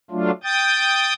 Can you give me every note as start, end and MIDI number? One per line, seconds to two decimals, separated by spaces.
0.11 0.31 54
0.11 0.31 57
0.11 0.31 62
0.11 0.31 65
0.43 1.13 79
0.43 1.13 87
0.43 1.13 91
0.43 1.13 93